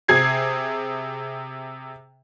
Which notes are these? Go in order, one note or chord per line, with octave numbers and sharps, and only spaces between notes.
C3 G#4 G#6 C7